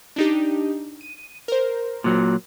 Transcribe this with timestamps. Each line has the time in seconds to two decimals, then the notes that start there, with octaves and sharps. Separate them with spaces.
0.16 D4 D#4 G4
1.01 D#7
1.48 A#4 C5
2.04 A#2 F#3